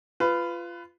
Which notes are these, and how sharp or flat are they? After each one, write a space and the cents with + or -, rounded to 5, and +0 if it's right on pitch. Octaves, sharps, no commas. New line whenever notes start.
F4 -15 B4 +15